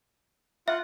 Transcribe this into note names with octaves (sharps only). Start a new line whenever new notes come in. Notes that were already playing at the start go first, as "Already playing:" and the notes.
F4 E5 F#5